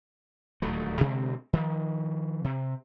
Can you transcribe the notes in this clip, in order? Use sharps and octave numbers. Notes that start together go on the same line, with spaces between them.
D#1 D2 F#3 A3
B2 D3 G#3 C4
D#3 F3
C3